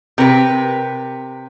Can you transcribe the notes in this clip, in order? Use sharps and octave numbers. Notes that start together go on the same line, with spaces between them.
C3 A#4 B4